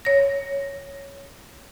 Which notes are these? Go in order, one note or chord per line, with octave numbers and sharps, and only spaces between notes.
C#5 A#6